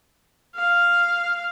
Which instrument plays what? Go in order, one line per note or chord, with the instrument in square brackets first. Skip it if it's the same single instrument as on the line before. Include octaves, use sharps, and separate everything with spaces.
[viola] F5